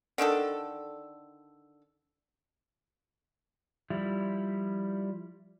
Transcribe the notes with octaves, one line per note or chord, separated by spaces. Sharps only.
D3 D#3 D4 A4
F3 G3 E4